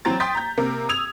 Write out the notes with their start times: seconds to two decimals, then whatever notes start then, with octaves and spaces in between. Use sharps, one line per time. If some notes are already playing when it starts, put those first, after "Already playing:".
0.05 E3 F#3 C4 C5 A#5 A6
0.20 G5 C6 D#6 G6 A6 B6
0.35 A#5 G6
0.58 C3 A#3 A#4
0.89 D#6 E6 G#6 F7